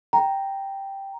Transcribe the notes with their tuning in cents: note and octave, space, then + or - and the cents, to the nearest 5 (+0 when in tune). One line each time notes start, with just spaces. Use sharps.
G5 +0 A#5 +0